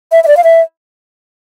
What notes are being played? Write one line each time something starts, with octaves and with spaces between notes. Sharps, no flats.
E5
E5
D5
F5
E5